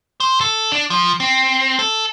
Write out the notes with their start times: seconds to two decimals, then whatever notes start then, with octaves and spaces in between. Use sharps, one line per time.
0.20 C5
0.41 A4
0.72 D4
0.90 F3
1.20 C4
1.79 A4